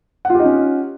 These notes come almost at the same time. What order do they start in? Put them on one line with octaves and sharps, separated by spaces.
F#5 F4 G4 D#4 C#4